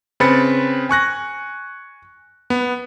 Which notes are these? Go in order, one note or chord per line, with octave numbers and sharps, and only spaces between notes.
C#3 C4 B4 B5 A6 C#7
G#5 C#6 F#6 A#6
B3